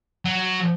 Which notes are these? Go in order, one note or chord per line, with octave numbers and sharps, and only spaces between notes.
F#3